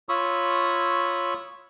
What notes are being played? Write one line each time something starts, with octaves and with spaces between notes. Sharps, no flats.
F4 C#5 B5 C#6 D#6 E6